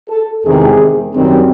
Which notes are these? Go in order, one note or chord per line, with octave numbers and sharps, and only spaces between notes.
A4
E2 C3 D#3 G#3 C4 G#4
F#2 D#3 G3 C4